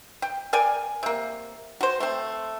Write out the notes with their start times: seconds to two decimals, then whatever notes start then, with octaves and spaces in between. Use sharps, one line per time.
0.22 G5
0.53 A#4 D5 G5 G#5
1.03 C3 A#3
1.81 F#4 C5
2.00 A3 C4